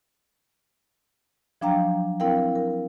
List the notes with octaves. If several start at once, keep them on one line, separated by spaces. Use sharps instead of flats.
F3 F#3 D4 F5 G5 A#5
C4 E4 A#4 F5 G5
A#4